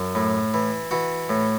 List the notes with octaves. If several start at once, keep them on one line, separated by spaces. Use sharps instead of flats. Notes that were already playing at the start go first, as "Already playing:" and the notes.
Already playing: F#2
A2
E3
E3 F#4
A2